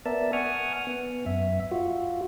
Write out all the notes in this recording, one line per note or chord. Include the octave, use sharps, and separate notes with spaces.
B3 A#4 D5 E5 A5
F#5 G#5 C#6 D#6 F6
B3
F#2 E5
F4 F#4